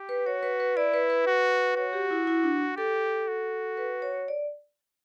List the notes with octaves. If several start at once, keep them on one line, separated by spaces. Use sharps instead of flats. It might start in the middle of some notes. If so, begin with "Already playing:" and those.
Already playing: G4
B4
F#4 C#5
B4
B4
E4 D5
B4
B4
F#4
F#4 C#5
G4
E4
E4
D4
G4 A4
F#4
B4
C#5
D5